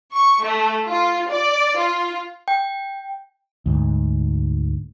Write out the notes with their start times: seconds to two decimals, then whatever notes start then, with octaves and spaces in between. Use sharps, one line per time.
0.14 C#6
0.44 A3
0.88 F4
1.30 D5
1.77 F4
2.48 G5
3.66 D2 G#2